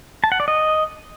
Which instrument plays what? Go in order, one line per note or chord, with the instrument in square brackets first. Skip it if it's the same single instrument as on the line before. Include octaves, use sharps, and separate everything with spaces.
[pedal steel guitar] A5
F#5
D5
D#5